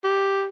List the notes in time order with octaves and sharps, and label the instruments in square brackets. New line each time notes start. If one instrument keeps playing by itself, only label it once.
[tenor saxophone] G4